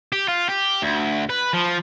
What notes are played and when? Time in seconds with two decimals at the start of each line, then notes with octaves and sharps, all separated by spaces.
0.12 G4
0.28 F4
0.49 G4
0.82 D2
1.30 B4
1.54 F3